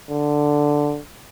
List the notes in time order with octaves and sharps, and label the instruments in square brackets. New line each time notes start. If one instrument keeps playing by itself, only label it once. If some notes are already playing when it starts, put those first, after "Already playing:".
[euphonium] D3